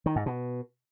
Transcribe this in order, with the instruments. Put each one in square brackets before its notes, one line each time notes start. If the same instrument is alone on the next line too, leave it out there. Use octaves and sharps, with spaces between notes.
[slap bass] D#3
G#2
B2